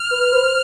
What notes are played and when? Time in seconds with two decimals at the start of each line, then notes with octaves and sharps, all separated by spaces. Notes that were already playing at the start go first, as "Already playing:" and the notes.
Already playing: F6
0.11 B4
0.33 C5